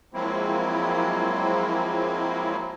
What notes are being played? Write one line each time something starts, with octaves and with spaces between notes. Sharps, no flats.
F3 F#3 G#3 A#3 C4 E4